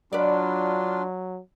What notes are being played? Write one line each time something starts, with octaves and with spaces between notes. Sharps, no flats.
F#3 D4 F4 B4 D5